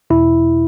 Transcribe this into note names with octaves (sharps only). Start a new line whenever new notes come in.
E2 B2 E4